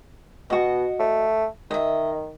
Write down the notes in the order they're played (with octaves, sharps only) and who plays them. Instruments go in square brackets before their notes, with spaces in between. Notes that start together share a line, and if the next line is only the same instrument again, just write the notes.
[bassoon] B2 [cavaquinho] F#4 D#5
[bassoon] A3
[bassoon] D#3 [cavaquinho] D#5 E5